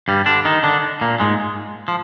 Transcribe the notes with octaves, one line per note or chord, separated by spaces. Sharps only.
G2 G3
D3 D4
D#3 D#4
D3 D4
A#2 A#3
G#2 G#3
F3